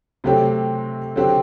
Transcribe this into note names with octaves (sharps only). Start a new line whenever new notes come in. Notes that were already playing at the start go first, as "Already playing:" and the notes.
C3 F#3 A3 C4 G4
D3 F#3 C4 G4